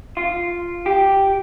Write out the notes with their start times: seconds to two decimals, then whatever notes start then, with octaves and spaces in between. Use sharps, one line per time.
0.17 F4
0.86 G4